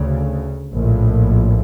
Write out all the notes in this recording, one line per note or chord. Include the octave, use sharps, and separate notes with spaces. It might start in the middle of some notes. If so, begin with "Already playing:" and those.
Already playing: D2 C#3
A#1 A2